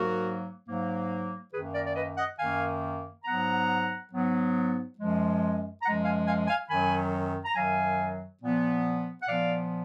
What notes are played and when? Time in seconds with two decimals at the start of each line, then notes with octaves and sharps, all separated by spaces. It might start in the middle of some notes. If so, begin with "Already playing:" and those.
Already playing: G#2 F#3 A#3 F#4 A#4
0.66 G#2 F#3 A#3
1.53 F#2 D#3 A#3 G#4 B4
1.74 A#4 D5
1.86 D5
1.95 B4 D#5
2.17 D#5 F#5
2.38 F#2 D#3 A#3 F5 G#5
3.24 G#2 F#3 B3 F#5 A#5
4.11 G#2 F#3 B3
4.97 F#2 F3 G#3
5.83 F#2 F3 G#3 F#5 A#5
6.04 F5 G#5
6.26 F5 G#5
6.47 F5 G#5
6.69 F#2 D#3 F#3 G#5 B5
7.45 A#5
7.55 F#2 D#3 F#3 F5 G#5
8.40 A#2 F3 B3
9.21 F#5
9.27 A#2 F3 B3 D5 F5